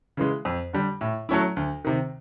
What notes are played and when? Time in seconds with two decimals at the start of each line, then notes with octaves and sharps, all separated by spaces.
0.17 C#3 E3 G#3
0.45 F2
0.73 D3 G3
1.01 A2
1.29 F#3 A3 C#4 E4
1.56 D2
1.85 C3 D#3